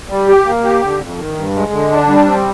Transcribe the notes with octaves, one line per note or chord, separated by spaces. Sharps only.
G3
G4
A#3
G4
D3
F2
D#3
G2
G#3
D3
D4
G3
C4